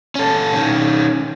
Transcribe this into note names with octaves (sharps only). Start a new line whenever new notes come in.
C#4 A4
D#3 C#4